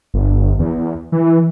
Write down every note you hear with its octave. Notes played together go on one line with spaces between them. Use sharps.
G1
E2
E3